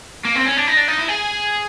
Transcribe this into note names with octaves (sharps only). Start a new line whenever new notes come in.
A#3
C4
C#4
D4
D#4
D4
D#4
E4
G#4